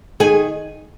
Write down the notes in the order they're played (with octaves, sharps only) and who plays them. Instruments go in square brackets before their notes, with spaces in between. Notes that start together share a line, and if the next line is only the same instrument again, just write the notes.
[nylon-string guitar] D#3 G#4 G#5